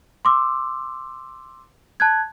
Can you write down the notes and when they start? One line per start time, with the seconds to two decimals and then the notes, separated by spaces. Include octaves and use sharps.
0.25 C6 D6 E6
2.00 A5 F#6 G#6